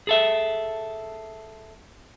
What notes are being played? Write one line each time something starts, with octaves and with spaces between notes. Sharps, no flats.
G#4 A4 E5